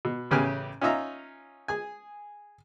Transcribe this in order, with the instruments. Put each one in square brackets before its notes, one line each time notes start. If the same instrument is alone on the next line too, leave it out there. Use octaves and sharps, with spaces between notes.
[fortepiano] B2
A1 C#3 G4 B4 G#5 F6
C#4 D#4 F4 E5 A#5
G#4 G#5